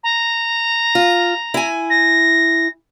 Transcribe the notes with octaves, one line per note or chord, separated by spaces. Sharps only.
A#5
F4
E4 G#5
A#6